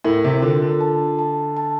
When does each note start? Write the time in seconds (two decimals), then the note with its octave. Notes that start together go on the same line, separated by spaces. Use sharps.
0.04 A2 A#4
0.24 C3
0.42 D3 F4
0.62 D3
0.81 A5
1.19 A5
1.57 A5